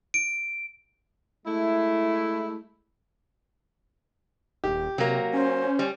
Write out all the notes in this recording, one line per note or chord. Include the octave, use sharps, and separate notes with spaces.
D7
G#3 A3 E4
D#1 G4
C3 F#3 A#3
C#4 C5
G3